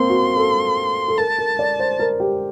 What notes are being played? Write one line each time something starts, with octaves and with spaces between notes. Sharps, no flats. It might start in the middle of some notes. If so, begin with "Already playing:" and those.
Already playing: A#3 C4 C6
F#4
A4
A4
A#4 A5
A#4
D5
C5
A#4
G4